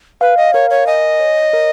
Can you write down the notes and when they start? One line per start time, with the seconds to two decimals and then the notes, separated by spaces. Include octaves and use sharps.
0.21 B4 F5
0.37 D#5
0.53 A#4 C#5
0.70 C#5
0.87 D#5 G#5
1.20 C#5
1.53 A#4